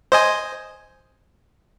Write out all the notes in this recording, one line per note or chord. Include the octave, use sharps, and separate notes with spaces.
C5 D#5 G#5